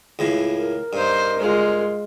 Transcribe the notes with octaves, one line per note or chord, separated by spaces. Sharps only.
C#2 A2 C#3
A#4
G2 D#4 C5
G#3 F4